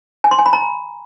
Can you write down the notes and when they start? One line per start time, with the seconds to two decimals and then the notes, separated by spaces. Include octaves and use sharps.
0.24 G#5
0.31 C6
0.39 G#5
0.46 B5
0.53 A#5